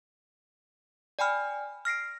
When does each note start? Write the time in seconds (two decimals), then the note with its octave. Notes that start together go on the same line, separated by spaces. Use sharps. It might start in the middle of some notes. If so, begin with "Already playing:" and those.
1.19 D5 G5 G#5 B5 F6
1.85 F6 A#6 C7 D7